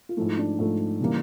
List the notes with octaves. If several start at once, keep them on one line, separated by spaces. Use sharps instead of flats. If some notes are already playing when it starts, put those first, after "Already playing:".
F4
G#2 F3 A3 E4
D4
G#2 F3 A3
C#3 E3 G3 A#3